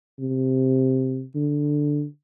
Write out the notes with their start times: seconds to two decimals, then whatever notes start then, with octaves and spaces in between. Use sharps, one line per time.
0.19 C3
1.35 D3